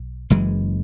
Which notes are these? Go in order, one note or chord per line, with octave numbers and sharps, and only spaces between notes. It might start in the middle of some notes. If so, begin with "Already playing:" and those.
Already playing: B1
F#1 F#2 E3 G#3